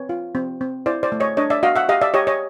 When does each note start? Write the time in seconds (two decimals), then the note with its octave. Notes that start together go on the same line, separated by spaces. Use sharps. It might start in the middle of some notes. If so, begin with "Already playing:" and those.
Already playing: C4 B4 C#5
0.09 F4
0.35 C4
0.61 C4
0.86 E4 C5 D5
1.03 C5 D5
1.12 A3
1.20 C#5 D#5
1.37 D4 C#5 D#5
1.50 D5 E5
1.63 F#4 D#5 F5
1.76 E5 F#5
1.89 G4 D#5 F5
2.02 D5 E5
2.14 G4 C#5 D#5
2.27 C#5 D#5